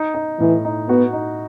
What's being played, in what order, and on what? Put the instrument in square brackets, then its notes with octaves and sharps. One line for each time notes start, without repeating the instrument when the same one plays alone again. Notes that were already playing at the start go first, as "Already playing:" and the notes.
Already playing: [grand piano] D#4
D#4
[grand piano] A2 [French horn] E3
[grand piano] D#4
[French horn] B3 [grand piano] F#4
[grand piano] D#4